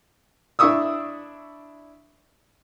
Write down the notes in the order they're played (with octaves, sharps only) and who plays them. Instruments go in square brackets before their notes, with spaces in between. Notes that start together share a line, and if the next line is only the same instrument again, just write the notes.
[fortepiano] D4 E4 E5 C#6 D#6 E6